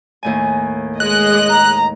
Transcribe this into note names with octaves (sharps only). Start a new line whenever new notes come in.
D#2 A2 G#5
G#3 D#5 F#6
A#5